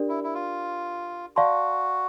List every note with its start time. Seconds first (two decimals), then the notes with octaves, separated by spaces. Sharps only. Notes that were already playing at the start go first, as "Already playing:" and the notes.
Already playing: D4 G4 A#4 D5
0.09 E4
0.24 E4
0.35 F4
1.36 F#4 D5 F5 A5 C6